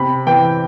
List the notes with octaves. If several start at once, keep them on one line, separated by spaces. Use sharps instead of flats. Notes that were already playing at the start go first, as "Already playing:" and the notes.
Already playing: C3 B5
E3 G5